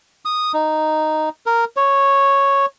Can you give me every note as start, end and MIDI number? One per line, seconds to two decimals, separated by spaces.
0.25 0.52 87
0.54 1.29 63
1.46 1.65 70
1.77 2.66 73